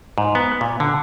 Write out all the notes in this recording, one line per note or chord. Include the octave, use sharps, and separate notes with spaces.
G#2
B3
A#2
D3